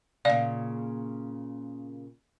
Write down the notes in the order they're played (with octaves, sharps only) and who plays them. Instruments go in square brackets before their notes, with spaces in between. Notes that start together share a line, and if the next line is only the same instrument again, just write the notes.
[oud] A#2 C#3 [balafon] D5 F5